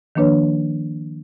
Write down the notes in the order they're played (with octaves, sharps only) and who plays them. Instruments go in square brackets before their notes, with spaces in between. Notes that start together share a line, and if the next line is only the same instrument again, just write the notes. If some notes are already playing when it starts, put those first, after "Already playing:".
[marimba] D#3 F3 A#3 D4 B4 C#5